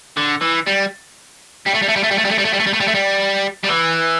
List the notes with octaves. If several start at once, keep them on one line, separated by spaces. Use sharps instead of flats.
D3
E3
G3
G3
A3
G3
A3
G3
A3
G3
A3
G3
A3
G3
A3
G3
A3
G3
A3
G3
A3
G3
G3
E3